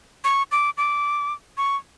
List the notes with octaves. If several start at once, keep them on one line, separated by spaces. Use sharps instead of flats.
C#6
D6
D6
C#6